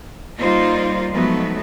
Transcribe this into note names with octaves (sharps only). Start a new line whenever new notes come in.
G3 A#3 D#4 F4 C5 D5
F3 F#3 G#3 A3 B3 D#4